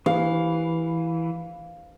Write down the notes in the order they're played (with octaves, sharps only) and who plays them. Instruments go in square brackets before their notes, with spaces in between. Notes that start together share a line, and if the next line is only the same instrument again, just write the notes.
[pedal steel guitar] E3 [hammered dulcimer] F5